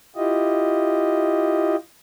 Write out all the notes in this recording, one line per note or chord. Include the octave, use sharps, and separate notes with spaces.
E4 F4 G4 D#5